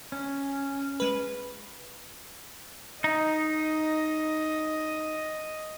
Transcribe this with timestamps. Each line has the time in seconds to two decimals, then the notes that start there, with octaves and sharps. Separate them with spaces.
0.12 C#4
1.00 G#3 B4
3.04 D#4 D#5